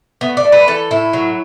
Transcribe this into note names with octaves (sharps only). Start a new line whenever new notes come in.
A3 B3
D5
A3
B4
E3 A4
A2 E4
F#3